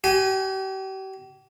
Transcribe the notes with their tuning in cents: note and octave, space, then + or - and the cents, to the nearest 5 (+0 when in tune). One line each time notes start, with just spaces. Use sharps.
G4 -40 G#5 -10